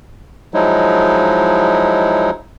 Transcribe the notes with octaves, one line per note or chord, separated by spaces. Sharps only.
F3 F#3 G#3 D#4 E4